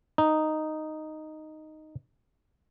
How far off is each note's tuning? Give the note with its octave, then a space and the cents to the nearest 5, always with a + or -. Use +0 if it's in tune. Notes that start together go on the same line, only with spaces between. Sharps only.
D#4 -5